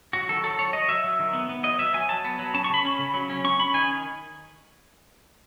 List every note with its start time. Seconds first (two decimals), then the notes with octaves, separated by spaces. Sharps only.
0.13 F#3 F#4
0.29 D#3 A4
0.44 F#3 A4
0.58 F#3 C#5
0.73 F#3 D#5
0.88 F#3 E5
1.04 F#3
1.19 D#3
1.33 B3
1.49 B3
1.63 F#3 D#5
1.78 F#3 E5
1.94 F#3 G#5
2.09 F#3 A5
2.25 B3
2.39 F#3
2.54 C#4 A5
2.64 C#6
2.69 C#3 B5
2.85 C#4
2.99 C#3
3.14 F#3
3.30 C#4
3.44 C#4 C#6
3.59 C#4 B5
3.74 D#3 G#5